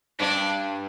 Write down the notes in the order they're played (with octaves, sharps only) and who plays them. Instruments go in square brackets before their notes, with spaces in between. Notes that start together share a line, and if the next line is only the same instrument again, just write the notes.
[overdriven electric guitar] G2 [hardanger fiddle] D4